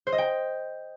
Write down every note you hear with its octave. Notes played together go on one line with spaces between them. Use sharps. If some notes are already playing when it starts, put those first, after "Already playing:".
C5
D#5
G5